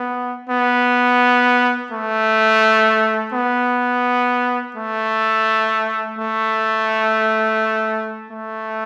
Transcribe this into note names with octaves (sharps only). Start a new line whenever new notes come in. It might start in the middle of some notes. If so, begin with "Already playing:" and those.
Already playing: B3
B3
A3
B3
A3
A3
A3